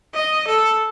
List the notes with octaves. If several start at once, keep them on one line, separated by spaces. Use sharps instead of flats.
D#5
A4